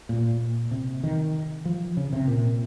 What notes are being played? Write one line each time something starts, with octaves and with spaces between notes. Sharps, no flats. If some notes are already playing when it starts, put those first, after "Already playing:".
A#2
C3
D#3
F3
C#3
C3
A#2